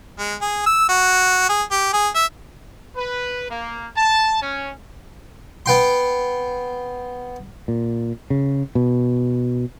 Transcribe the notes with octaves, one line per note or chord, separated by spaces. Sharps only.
G#3
G#4
E6
F#4
G#4
G4
G#4
E5
B4
A#3
A5
C#4
B3 G5 C6
A#2
C#3
B2